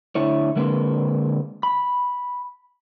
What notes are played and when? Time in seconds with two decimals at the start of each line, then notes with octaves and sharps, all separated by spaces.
0.15 D2 D3 E4 C#5
0.56 D3 G#3 A#3 C4 B4 C5
1.63 B5